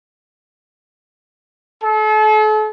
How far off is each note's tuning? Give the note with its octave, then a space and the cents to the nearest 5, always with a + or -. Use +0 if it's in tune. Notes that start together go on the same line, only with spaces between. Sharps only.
A4 -40